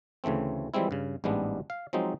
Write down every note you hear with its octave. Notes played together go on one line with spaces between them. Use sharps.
D2 C#3 E3 A3 C4
E3 F3 G3 G#3 C4 E4
G2 C#3
A1 G#2 G3 G#3 B3 D4
F5
F3 F#3 G#3 C4 D#4